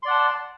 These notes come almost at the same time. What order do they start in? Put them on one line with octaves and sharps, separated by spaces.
C6 D5 F#5 A5